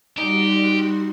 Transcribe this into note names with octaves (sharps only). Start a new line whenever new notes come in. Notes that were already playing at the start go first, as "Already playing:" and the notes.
G3 D#4 F#4 G4 C6